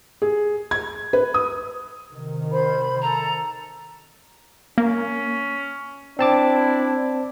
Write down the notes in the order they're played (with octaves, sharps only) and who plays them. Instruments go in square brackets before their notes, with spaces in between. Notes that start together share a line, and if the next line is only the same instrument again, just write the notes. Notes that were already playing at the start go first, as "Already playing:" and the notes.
[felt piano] G#4
G#6
B4
D#6
[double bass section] C3 D#3
[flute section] C5 B5
[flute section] A4 [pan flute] A#5
[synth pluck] A#3 [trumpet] C#4
[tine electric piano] C4 A5 D6 [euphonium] D4 [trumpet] E4